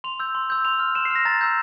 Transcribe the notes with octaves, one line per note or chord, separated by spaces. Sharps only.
C6 F7
E6 G6
C6
E6 G6
C6 F7
F6
C6 E7
C7
F6
A#6
A#5 A6
E6 G6